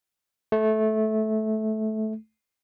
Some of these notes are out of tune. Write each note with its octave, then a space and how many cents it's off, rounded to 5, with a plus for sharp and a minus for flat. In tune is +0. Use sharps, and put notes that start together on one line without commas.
A3 -15